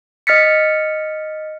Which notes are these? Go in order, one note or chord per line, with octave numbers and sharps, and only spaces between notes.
D#5 F6 A6 B6 C#7